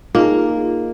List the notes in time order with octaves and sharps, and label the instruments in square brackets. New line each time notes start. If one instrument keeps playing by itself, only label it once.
[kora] A#3 [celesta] D#4 D#5 [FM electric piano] F4 G#4